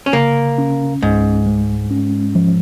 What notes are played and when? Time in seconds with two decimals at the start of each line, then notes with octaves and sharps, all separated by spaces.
0.06 C#4
0.13 C#3 A#3
0.58 C#4
1.02 C#2 G#2
1.46 G#3
1.91 C#4
2.35 F3